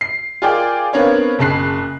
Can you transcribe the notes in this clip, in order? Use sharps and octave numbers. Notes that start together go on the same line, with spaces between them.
C7
F4 G#4 A#4 D5 G5
B3 C4 D4 A#4 C#5 F5
F#1 C#3 A5 F#6 C7